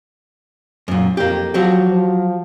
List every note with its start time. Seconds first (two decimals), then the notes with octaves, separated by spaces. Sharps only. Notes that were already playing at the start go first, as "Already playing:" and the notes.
0.88 F#2 A#2
1.17 F2 A#3 G4
1.54 F3 F#3 F#4 G4
1.92 F3